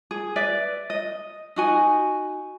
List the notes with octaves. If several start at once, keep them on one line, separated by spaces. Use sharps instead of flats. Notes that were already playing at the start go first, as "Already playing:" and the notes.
G#4
B4 D5 E5
D#5
D#4 F#4 G#5